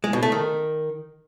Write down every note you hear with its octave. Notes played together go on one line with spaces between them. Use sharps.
G#3
B2
A3
D#3